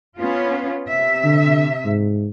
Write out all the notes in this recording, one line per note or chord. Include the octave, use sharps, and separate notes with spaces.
B3 C#4 F4
C3 E5
D3
G#2